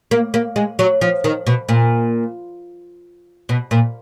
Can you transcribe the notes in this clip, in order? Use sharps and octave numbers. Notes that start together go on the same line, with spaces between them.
A#3
A#3
G#3
F#3
F3
D#3
B2
A#2
B2
A#2